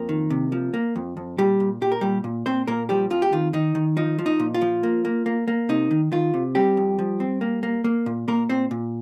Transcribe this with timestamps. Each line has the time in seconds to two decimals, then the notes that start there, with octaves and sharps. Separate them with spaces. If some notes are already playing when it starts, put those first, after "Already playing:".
Already playing: F2 A#3 A#4
0.09 D#3
0.30 C3
0.52 F3
0.74 A#3
0.96 F2
1.17 F2
1.38 A#2 G3 G4
1.60 A#2
1.81 A#2 G4
1.92 A#4
2.01 A#2 G3 G4
2.24 A#2
2.46 A#2 C4 C5
2.67 A#2 A#3 A#4
2.89 F3 G3 G4
3.10 F2 F4
3.22 G4
3.32 D#3 F4
3.53 D#3 D#4
3.75 D#3
3.97 F3 D#4
4.19 F3
4.26 D#4
4.39 A#2
4.54 F4
4.62 F3
4.83 A#3
5.05 A#3
5.26 A#3
5.48 A#3
5.69 C3 D#4
5.91 D#3
6.12 D#3 F4
6.34 C3
6.55 G3 C4 G4
6.77 F2
6.99 F3
7.20 C4
7.41 A#3
7.63 A#3
7.84 A#3
8.06 A#2
8.28 A#2 A#3 A#4
8.49 A#2 C4 C5
8.71 A#2